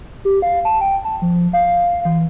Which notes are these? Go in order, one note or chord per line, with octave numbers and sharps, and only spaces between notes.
G4
F5
A5
G5
A5
F3
F5
E3